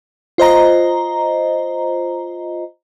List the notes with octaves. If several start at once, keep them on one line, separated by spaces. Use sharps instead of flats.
F4 C5 D#5 A#5